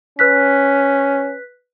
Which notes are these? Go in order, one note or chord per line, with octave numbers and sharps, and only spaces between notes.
C#4 B4 F#6 B6